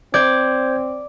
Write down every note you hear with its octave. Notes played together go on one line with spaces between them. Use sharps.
C4 C5 D5 G6 G#6